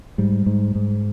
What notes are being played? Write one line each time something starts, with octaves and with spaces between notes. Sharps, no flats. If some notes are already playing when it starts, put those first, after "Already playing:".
G#2 G3
G#2
G#2